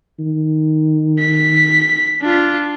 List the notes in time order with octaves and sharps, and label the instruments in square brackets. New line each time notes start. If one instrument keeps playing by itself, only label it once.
[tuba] D#3
[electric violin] B6
D4 F4